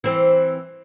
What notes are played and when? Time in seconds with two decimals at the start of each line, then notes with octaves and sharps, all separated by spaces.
0.04 E3 C4